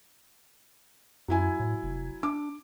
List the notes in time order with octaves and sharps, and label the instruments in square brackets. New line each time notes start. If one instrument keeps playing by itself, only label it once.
[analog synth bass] F#2 [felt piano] F#3 E4 G#5
[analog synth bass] A2
F1
[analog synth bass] D4 [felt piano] D6